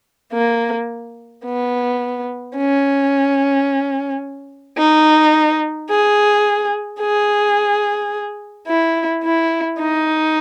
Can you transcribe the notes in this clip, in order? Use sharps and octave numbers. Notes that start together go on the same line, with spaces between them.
A#3
B3
C#4
D#4
G#4
G#4
E4
E4
D#4